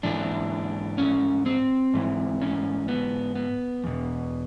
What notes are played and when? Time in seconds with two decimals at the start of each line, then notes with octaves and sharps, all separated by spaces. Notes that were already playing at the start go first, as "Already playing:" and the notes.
0.03 G#2 E3 D4
0.98 C#4
1.46 C4
1.94 G#2 E3
2.42 C#4
2.88 B3
3.35 B3
3.84 E2 B2